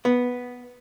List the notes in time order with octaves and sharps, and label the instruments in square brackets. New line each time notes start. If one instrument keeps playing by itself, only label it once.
[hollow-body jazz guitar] B3